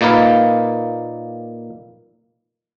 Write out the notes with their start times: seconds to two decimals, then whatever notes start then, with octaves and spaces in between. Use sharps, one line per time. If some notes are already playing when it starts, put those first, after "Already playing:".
0.01 A#2 A#3 D#4 B4 F5